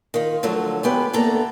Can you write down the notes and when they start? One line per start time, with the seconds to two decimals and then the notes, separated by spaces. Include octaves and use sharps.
0.14 D#3 F4
0.43 D3 F3 F#3 A3
0.83 G#3 B3 G4 B4
1.13 D2 A#3 B3 A4 A#5